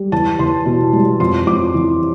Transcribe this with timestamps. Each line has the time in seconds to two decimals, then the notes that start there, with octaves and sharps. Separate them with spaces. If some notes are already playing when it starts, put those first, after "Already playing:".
Already playing: G3
0.12 E2 A5
0.39 E2 C6
0.66 B2
0.93 G3
1.20 F2 C6
1.47 F2 D6
1.74 E3